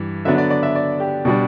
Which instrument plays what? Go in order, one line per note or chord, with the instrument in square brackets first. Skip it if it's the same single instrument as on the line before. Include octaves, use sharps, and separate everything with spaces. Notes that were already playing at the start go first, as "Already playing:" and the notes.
Already playing: [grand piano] G2 E3
D3 F#3 B3 D4 E5
D5
D5
E5
D5
G4
B2 G3 D4